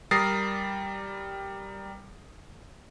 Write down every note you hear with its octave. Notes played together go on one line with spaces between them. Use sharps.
G3 A#4 D#6 A6 A#6 C7